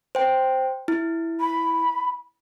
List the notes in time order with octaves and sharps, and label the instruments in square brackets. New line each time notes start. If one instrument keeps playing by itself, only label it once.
[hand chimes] C5 G5
E4
[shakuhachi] B5